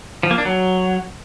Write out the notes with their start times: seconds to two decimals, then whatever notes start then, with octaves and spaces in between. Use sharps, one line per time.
0.23 F3
0.31 A#3
0.38 D4
0.45 F#3